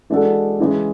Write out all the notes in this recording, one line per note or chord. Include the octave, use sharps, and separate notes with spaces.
E3 G#3 D4 F#4 A4
C#3 E3 G#3